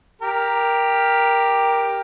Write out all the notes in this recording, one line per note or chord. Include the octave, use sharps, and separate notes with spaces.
G4 A#4